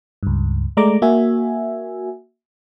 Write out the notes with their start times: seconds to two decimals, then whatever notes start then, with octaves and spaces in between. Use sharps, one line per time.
0.23 C#2 G2
0.77 G#3 A3 D5 A#5 D6
1.02 A#3 F#4 E5 G#5